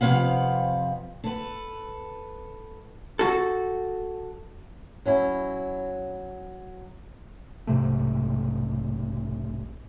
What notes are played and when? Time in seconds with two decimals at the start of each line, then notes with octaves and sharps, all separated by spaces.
0.01 F2 C3 B4 F5 F#5
1.24 A4 B4
3.19 F#4 A4
5.06 F#3 C#4 E4
7.67 B1 G#2 C3 A3